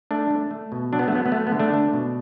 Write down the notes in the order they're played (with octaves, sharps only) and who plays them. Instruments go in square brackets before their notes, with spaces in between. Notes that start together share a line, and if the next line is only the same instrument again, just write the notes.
[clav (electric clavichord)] A3 D4
A3
A3
B2
F#3 D4
B3
A3
F#3 B3
B3
A3
B3
D3
A3 D4
A3
B2